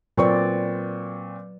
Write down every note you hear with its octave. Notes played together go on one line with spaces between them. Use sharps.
A#2 F#3 C4 B4 D5 C#6